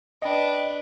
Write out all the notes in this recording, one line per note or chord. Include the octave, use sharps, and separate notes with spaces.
D4 B4 D#5 G5 B5